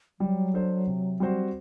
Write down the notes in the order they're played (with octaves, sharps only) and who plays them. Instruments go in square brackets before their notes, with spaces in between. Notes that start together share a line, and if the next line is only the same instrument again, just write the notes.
[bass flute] F#3 [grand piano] G3
[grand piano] D4 A4 C5
C3
G3 C4 F#4 C5